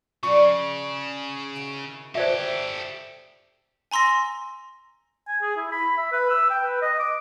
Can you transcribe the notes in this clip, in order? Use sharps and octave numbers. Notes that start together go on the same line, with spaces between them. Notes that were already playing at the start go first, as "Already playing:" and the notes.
C#3 D4 F#4 D5 C#6
D#3 E4 F#4
G4 A4 C5 D5 E5
G#5 A#5 C6 E6 A#6
G#5
G#4
E4
B5
E5
B4
E6
G5
B4
D#5
D6